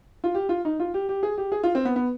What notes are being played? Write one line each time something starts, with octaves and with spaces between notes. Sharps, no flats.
F4
G4
F4
D#4
F4
G4
G4
G#4
G4
G#4
F4
C4
B3
B3